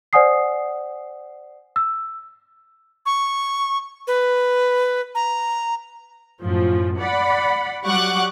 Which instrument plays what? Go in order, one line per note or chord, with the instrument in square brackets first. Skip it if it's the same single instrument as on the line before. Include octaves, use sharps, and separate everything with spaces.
[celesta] C5 D5 F#5 G#5 D#6 C7
E6
[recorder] C#6
B4
A#5
[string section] F#2 A2 F3
D5 F#5 B5
F#3 G3 F#5 C#6 D6 F#6